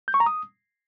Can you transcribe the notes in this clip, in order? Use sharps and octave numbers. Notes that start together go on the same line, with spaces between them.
G6
C#6
A#5
D#6